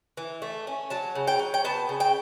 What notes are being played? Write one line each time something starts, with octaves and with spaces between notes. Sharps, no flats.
E3
A3
C#4
F#3 A5
C#3
G5
F#3
G5
B3 A5
C#3
G5